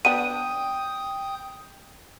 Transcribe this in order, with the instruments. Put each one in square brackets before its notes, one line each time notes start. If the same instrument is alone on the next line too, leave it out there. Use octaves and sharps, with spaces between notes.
[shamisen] B3 D4 [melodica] G5 D#6 [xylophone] D#7